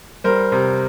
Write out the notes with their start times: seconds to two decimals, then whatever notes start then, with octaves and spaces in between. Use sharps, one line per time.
0.24 G3 A#4 C5
0.52 C3